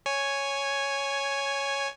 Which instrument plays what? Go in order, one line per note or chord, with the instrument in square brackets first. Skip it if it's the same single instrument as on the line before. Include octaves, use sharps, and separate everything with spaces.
[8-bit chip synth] C#5 G#5